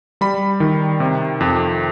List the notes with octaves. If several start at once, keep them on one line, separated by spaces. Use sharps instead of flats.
G3 B5
D#3
C3
F2